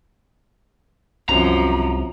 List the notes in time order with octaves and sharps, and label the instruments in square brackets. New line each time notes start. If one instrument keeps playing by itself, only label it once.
[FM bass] C2 [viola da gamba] F#2 F3 [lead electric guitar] A#5